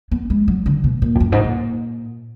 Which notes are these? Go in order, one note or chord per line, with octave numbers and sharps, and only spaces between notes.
B3
G#3
F#3
D3
B2
A#2
F2
F#2
G#2
A#2